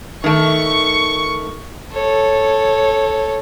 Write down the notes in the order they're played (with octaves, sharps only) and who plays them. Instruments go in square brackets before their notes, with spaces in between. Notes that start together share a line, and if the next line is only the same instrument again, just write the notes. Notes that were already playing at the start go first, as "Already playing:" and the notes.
[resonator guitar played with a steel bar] D#3 A3 [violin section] C#6
[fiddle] A4 C#5